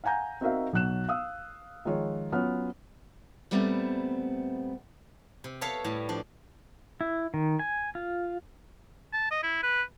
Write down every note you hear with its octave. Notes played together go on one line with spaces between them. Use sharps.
F5 F#5 G#5 A#5 G6
C4 D#4 F#4 A#4 E5 F5
B1 F#3 F#6 E7
F5 D#6 E6
D#3 F3 G#3 F4 C#5
F#3 B3 C#4 F4 C#5 F6
A#2 G3 A3 B3 C4
C3
B3 A4 C#5 E5 F5 A5
A2 G3 A5
F3 D4
E4
D#3
G#5
F4
A5
D#5
E4
B4